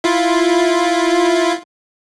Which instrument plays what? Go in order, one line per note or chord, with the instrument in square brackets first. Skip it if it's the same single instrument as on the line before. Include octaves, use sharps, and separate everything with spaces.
[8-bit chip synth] E4 F4